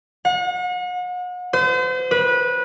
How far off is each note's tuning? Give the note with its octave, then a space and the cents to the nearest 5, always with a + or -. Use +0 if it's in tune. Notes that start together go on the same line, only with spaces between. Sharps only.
F#5 -40
C5 -40
B4 -20